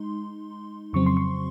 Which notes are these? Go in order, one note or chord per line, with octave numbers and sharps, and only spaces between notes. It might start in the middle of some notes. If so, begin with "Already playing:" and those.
Already playing: G#3 D#4 C6
F2 C#3 F#3 C4 C#6
C6
C#6